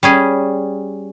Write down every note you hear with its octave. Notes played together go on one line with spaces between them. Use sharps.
G3 C#4 G#4